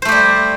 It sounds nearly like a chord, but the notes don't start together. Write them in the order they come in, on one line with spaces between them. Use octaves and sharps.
C5 A3 G4 G3